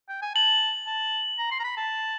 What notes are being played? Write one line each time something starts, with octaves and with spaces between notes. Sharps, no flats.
G5
G#5
A5 F#7
A5
A#5
C6
A#5
B5
A5